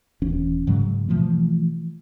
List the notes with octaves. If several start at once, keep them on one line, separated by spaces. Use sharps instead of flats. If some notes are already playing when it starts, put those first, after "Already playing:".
D#1 E3 C#4
G#2 C#3 F#3 G#3
B2 E3 F3 A3